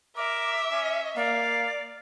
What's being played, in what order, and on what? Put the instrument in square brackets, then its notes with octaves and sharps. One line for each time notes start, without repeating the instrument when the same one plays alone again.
[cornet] A#4 [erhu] E5 [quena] D6
[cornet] C#4
[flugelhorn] A#3 [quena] D5 [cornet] F5